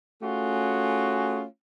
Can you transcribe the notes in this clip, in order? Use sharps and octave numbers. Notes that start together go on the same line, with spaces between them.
A3 C#4 F4 F#4 G#4